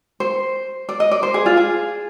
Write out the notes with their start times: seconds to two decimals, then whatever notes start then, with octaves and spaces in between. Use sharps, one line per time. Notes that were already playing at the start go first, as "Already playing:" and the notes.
0.20 C5
0.89 D5
1.00 D#5
1.11 D5
1.23 C5
1.34 G#4
1.46 F4
1.57 G#4